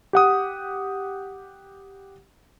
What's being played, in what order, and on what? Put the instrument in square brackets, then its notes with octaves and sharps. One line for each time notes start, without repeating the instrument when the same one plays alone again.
[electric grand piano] G4 F#5 D#6